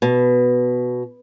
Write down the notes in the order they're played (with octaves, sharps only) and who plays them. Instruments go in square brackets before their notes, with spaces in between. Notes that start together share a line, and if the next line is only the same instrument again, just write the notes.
[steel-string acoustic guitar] B2